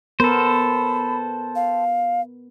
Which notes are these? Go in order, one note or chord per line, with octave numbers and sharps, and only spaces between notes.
B3 A4 A#4 C5 B5
F5